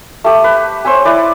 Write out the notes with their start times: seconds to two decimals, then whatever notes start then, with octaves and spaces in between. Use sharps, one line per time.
0.24 A3 G4
0.44 B4
0.85 C5 C#5 E5 G#5
1.05 E4 B4 D5